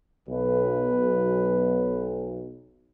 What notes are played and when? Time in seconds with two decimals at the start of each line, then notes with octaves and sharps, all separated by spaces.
0.28 B1 B4